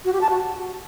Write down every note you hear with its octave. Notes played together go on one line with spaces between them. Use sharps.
F#4
G4
A5
F#4